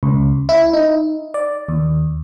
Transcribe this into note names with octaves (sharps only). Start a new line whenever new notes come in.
C#2
E4
D#4
D5
D#2